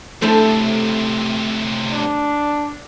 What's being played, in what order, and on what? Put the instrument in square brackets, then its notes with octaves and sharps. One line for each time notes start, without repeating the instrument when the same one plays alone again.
[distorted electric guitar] A2 C3 [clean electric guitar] A3 [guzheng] E4 A4 C5
[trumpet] D4